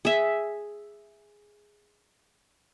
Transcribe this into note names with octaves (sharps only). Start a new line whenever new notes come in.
G#4 E5